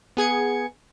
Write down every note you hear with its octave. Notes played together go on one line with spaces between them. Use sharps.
B3 G#4 G#6 C#7